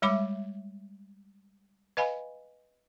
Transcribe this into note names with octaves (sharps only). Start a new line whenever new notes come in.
G3 G#3 C#5 E5 B5 D6
B4 D#5 F5 G#5 B5